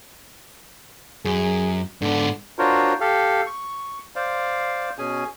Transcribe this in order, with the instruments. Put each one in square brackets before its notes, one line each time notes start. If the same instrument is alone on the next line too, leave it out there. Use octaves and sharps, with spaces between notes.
[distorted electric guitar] F#2 [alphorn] G#4
[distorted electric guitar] G#2 B3 [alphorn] D3
[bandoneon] D4 F4 F#4 A#4 C5 C#5
G4 A4 F5
C#6
C5 D5 F5
B2 C#4 G#4 G#5